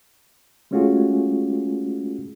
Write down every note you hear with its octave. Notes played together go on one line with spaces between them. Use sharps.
G#3 A3 C#4 F4 F#4 G#4